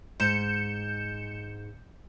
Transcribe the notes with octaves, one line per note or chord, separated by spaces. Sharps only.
G#2 G6 C#7 E7